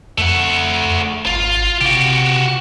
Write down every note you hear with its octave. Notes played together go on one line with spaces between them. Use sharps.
F2 A3 F#5
G#1 F4
C3 F#4 G4